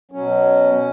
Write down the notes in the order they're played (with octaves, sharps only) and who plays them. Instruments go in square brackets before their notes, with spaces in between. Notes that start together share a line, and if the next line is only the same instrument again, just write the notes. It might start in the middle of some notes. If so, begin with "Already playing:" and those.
[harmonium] B2 F#3 C#4